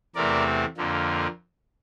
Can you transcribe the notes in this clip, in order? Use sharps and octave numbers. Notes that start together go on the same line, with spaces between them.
E2 C3 E3 A3 C4 A#4 D5
F2 D3 F3 A#3